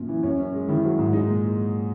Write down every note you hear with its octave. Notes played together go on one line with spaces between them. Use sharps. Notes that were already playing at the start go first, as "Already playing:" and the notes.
Already playing: F#2 A#2
E3
F#2 C#4
F#2
G#3
D#3 E4
F#3
G#2
G#3 D#4
A#2
G#3